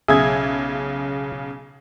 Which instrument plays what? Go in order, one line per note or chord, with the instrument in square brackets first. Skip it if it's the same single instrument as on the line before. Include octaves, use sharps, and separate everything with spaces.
[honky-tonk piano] B1 C#3 G#6 [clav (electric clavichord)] G#4 E5